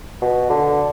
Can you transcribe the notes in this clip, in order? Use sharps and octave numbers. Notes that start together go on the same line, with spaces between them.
B2
D3